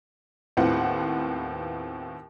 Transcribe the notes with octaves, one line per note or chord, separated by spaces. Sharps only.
D#2 A2 B3 C4 F4 F#5